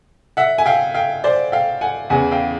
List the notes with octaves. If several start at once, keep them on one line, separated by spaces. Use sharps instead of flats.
E5 F#5
G#5
F5 G5
F5 G5
C5 D5
F5 G5
F#5 G#5
E2 C#3 E3 F#5 G#5
F5 G5